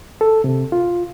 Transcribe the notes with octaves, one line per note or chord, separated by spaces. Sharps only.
A4
C3
F4